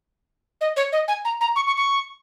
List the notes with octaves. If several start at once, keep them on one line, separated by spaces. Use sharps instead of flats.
D#5
C#5
D#5
G#5
A#5
A#5
C#6
C#6
C#6